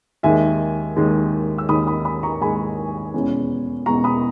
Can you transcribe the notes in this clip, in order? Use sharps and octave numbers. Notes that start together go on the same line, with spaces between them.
D#2 D#3 G#3 E5 G#5
D#2 D#3 G#3
E6
D#2 D#3 G#3 B5 D#6
B5 D#6
B5 D#6
A#5 C#6
D#2 D#3 G#3 G#5 B5
E2 B2 G#3 C#4
E2 B2 G#3 C#4 A#5 C#6
B5 D#6